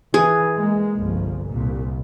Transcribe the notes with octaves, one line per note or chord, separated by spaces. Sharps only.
E3 G#4
G#3 A#3
G1 C2 F3
C2 A#2